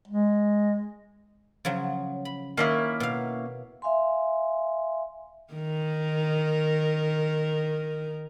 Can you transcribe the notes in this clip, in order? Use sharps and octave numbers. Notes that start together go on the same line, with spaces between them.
G#3
C#3 F3 F#3
B5
D#3 A#3 C#4 E4
B2 F5
E5 F5 G#5 C6
D#3 A#4